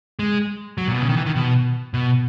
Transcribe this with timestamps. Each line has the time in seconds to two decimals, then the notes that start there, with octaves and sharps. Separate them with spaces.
0.19 G#3
0.78 F#3
0.88 A#2
0.94 B2
1.02 C#3
1.09 D#3
1.17 E3
1.26 D#3
1.35 B2
1.94 B2